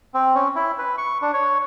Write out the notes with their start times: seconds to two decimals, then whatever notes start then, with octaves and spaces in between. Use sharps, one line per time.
0.14 C4
0.35 C#4
0.55 E4
0.78 B4
0.98 C#6
1.22 D4
1.34 C#5